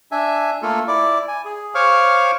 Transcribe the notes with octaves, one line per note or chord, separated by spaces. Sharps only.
D4 E5 G#5
A3 A#3 F4 A4
E4 D5 D6
G#5
G#4
C5 C#5 F5 C#6 D6 F6